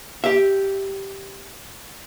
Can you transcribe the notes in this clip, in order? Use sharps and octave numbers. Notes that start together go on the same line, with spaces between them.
G4 E5